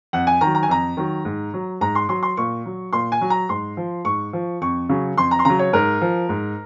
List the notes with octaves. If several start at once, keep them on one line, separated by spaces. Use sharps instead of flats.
F2 F#5
G#5
D#3 F#3 A#5
A#5
G#5
F2 A#5
D#3 F#3
G#2
F#3
G#2 A#5
C6
F#3 C6
C6
A#2 C#6
F#3
A#2 C6
G#5
F#3
A#5
G#2 C6
F3
G#2 C#6
F3
F2 C#6
C#3 F#3
F2 C6
A#5
C6
C#3 F#3 A#5
C#5
G#2 A#4
F3
G#2